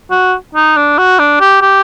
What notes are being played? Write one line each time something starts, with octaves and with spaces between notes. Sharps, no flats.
F#4
D#4
D4
F#4
D4
G4
G4